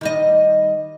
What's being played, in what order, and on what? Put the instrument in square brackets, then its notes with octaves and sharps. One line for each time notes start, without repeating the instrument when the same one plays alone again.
[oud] D#3 G3 D#5